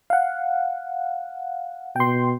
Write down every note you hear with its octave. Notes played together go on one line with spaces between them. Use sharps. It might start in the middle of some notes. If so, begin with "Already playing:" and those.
F5 F#5
B2 G5 C6